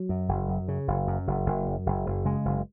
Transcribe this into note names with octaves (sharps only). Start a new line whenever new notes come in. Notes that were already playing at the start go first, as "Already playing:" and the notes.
Already playing: F#3
F#2
F#1
F#2
C#3
F#1
F#2
F#1
F#1
F#2
F#1
F#1
C#3 G#3
F#1